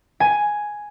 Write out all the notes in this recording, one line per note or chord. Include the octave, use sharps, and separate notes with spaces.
G#5